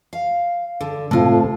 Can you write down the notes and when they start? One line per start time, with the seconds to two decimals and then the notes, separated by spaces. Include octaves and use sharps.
0.13 F5
0.81 D3
1.11 A2 C3 A3 F4